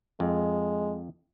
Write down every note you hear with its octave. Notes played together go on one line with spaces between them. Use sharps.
F2 G#3